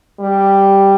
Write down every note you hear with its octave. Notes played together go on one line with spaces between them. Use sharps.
G3